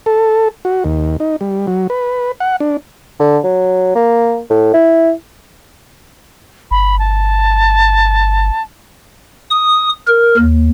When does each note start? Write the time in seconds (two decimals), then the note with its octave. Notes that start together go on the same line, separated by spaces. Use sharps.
0.06 A4
0.65 F#4
0.84 D#2
1.20 D#4
1.41 G3
1.67 F#3
1.90 B4
2.40 F#5
2.60 D4
3.20 D3
3.44 F#3
3.95 A#3
4.50 A2
4.74 E4
6.71 G1 B5
6.99 A5
9.50 D#6
10.07 A#4
10.37 D#2